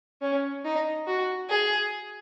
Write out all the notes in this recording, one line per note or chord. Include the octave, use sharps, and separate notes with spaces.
C#4
D#4
F#4
G#4